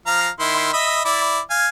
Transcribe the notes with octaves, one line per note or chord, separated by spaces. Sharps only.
F3 F5 A#5
D#3 E4 C6
D#5 E5 B5
E4 D5
F5 G#5